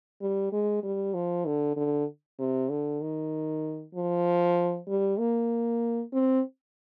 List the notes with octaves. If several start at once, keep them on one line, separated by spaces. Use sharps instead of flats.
G3
G#3
G3
F3
D3
D3
C3
D3
D#3
F3
G3
A#3
C4